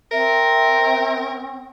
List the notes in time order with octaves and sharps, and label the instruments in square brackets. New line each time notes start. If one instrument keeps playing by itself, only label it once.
[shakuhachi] C4 [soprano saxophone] A#4 [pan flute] E5